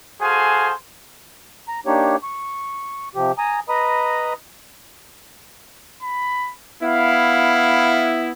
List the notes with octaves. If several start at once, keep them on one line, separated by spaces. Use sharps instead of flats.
F#4 G#4 A4 C5 F5 G#5
A#5
A#3 D4 D#4 G4 C#5
C#6
C3 F3 G4
G#5 A#5 D#6
B4 D#5 A#5 B5 D#6
B5
B3 E4 F5